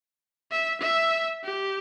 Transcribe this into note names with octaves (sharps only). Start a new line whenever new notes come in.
E5
E5
G4